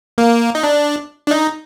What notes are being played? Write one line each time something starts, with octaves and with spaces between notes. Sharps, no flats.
A#3
D#4
D4
D4
D#4